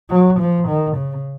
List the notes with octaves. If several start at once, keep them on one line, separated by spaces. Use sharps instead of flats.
F#3
F3
D#3
C#3